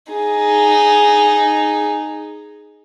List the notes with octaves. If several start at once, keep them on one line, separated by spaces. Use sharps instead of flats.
D#4 G#4